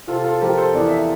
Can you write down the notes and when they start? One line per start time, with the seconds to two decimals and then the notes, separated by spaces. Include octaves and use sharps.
0.07 C3 F4 A4
0.24 F4 A4
0.41 F3 G4 A#4
0.57 A4 C5
0.74 E2 D5
0.88 E5